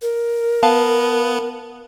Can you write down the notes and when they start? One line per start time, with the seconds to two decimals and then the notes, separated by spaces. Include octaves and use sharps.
0.02 A#4
0.63 B3 F5 A5